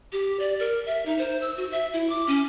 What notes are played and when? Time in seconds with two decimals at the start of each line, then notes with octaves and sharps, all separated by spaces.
0.13 G4
0.40 D5
0.60 A#4
0.86 E5
1.06 D#4
1.18 C5
1.42 E6
1.57 F#4
1.71 E5
1.93 E4
2.09 D6
2.27 C#4